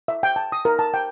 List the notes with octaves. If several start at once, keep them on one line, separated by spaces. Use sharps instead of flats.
E5
G5
A5
D#6
A#4
A5
G5